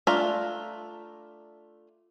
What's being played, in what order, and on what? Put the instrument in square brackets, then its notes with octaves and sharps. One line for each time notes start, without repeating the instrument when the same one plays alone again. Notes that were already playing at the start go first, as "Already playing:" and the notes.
[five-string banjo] A3 D4 F4 E5 A#5